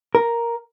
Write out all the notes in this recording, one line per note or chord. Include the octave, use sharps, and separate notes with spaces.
A#4